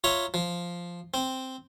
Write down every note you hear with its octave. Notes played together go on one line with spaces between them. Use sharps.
F4 C#5 E5 A#5
F3
C4